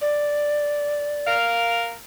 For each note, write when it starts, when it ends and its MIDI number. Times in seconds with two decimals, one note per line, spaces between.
0.01 1.36 74
1.27 1.93 70
1.27 1.93 77